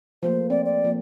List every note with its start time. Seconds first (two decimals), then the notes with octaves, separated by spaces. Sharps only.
0.23 F3 A3 A#3 C5
0.50 C4 D5
0.65 D5
0.84 F3 A#3